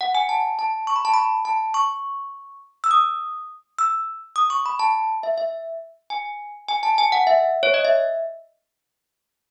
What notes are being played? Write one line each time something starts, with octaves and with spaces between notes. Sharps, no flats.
F#5
G#5
A5
A5
C#6
B5
A5
B5
A5
C#6
E6
D#6
E6
D#6
C#6
B5
A5
E5
E5
G#5
G#5
A5
G#5
F#5
E5
C#5
D#5
E5